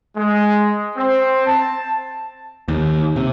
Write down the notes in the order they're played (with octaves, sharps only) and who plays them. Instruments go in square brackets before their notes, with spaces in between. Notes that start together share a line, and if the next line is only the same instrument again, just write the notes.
[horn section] G#3
C4
A5
[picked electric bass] D#2
C3